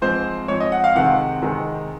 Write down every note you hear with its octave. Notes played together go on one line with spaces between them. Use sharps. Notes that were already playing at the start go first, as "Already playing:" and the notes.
G#2 F3 C4 C5
G#2 F3 C4 C#5
D#5
F#5
F5
C3 D#3 G#3 C4 F#5
C3 D#3 G#3 C4